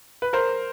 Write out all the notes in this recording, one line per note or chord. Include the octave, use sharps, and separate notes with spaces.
B4
A#4 C5